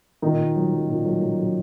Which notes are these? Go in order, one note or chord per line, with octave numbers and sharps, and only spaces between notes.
A#2 D#3 D#4
A#2
F#3
F#3
A#2
F#3
F#3
F#3